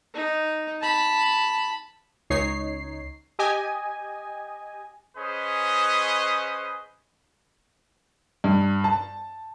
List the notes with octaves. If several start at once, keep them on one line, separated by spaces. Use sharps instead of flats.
D#4
A5 B5
C#2 D#4 C#5 C7
G4 D#5 G#5
C#4 G#4 B4 C5 D#5
G2
A5